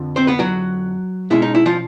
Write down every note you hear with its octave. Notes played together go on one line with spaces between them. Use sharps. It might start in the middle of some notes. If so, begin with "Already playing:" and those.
Already playing: F2 D3 F3
C4 C5
B3 B4
F#3 F#4
B2 G#3 C#4 E4
D#4
E4
F3 F4